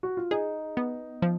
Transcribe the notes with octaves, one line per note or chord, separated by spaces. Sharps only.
F#4
F4
D#4 G#4
B3
F3